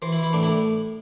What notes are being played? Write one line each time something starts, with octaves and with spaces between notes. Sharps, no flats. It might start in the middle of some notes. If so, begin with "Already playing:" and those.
E3 C5
E4
E3
E4
A2 D4
E4
A2